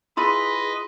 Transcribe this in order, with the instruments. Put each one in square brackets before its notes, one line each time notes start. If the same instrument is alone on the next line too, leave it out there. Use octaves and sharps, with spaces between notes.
[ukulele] E4 F4 B5 [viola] G#4 [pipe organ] B4 D#5 [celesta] C6